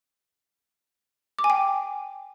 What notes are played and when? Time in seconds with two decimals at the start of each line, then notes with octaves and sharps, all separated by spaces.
1.39 D6
1.44 G#5
1.50 G5